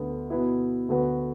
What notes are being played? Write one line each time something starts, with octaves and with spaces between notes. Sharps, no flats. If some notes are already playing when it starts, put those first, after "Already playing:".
Already playing: D2 D3 B3
B2 B3 E4
D2 D3 B3 F#4 B4